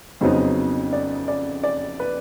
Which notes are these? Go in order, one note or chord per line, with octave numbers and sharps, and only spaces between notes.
F2 C#3 F#3 B3 D#4 C5
D5
D5
D5
B4